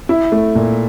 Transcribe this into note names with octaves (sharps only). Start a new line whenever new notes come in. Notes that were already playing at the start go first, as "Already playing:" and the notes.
E4
A3
A#2